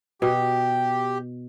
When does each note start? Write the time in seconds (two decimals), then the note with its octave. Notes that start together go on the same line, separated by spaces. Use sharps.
0.22 B2 G4